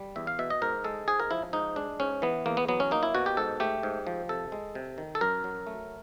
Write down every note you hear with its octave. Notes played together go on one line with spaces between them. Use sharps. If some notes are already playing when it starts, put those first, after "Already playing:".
Already playing: G3
E2 E5
F5
B2 E5
D#5
G#2 A#4
G#3 A4
G#2 G#4
A#4
F3 E4
G#2 D#4
G#3 D4
G#2 C#4
E3 B3
E2 A#3
B3
F#3 B3
C#4
A#3 D#4
E4
B2 F#4
G4
G#2 A4
A3 G4
G#2
F3
C3 A4
G#3
C3
D#3
A4
F#2 A#4
F#3
A3